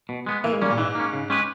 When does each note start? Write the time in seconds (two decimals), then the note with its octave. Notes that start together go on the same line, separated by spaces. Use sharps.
0.09 B2
0.26 G#3 B3
0.44 E3 A#3
0.53 G#3
0.61 G3 A#3 C#4
0.70 A#2
0.78 G#2 E3
0.95 A#3 C#4
1.13 C#3
1.30 G#3 C#4 G4 B4